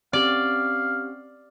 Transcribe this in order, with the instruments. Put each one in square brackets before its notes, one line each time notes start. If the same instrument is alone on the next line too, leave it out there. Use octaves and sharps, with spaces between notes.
[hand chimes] C4 C#4 G4 [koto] D5 [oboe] F5